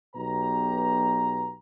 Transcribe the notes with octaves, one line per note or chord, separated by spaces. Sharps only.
B1 B2 G4 B4 A#5